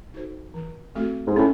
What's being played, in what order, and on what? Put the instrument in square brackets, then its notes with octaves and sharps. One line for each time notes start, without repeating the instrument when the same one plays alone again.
[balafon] D#4 F#4 A4 C5
E3
A3 C4 F#4 A4
[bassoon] G#2
[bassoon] A2 [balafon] C#4